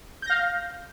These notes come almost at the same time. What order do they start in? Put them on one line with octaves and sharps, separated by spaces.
G6 A#6 F5